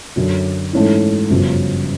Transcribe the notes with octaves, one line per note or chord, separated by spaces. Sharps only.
F#2 D3 F#3
G#2 E3 A3 C#4 E4
G1 F#2 C#3 F3